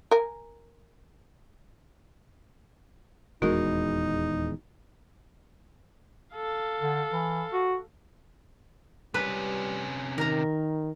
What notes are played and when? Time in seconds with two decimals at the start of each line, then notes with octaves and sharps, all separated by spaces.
0.11 A#4 G#5
3.42 D#1 E2 G#3 D#4 F#4 A#4
6.36 A4 F5
6.81 D3
7.12 E3
7.53 F#4
9.14 C3 G3 C#4 B4
10.18 D#3 A#4 A#5